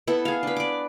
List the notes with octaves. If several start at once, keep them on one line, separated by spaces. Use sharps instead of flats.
B3 E4 A4
G#4 F5
D4 B4
D5 D6